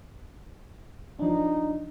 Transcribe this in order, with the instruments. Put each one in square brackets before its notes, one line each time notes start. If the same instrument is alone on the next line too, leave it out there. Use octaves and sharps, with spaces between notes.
[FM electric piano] F3 D4 [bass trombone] D#4